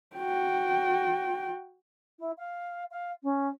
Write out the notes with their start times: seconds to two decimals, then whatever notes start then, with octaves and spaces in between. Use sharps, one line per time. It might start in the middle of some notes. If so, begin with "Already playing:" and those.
0.16 F#4 G5
2.19 E4
2.37 F5
2.90 F5
3.23 C#4